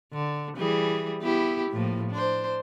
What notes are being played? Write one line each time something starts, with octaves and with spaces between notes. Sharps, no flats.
D3
E3 G3 G#4
B3 E4 G4
A2 F3 A#3
D4 C5